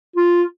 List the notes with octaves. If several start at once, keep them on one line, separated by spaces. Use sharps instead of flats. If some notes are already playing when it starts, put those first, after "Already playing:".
F4